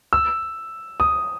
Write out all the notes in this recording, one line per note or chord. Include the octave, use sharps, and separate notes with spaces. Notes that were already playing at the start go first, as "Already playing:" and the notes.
E6
D#6